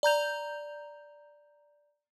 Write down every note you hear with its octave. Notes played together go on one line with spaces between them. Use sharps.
D5 A#5 G6 F7